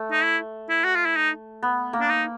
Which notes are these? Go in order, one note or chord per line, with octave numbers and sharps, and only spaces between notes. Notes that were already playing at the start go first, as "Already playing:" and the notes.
Already playing: A3
D#4
E4
E4
F#4
F4
E4
D#4
B3
A#3
D4
D#4